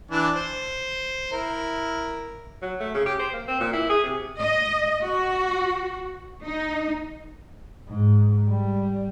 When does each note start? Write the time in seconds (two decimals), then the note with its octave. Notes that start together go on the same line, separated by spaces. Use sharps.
0.11 E3 D4
0.35 C5
1.33 E4 A#4
2.62 F#3
2.80 A3
2.94 C#3
3.06 G4
3.19 C5
3.33 A#3
3.48 C4
3.60 A#2
3.73 E4
3.90 G#4
4.04 C3
4.41 D#5
5.05 F#4
6.44 D#4
7.89 G#2
8.50 G3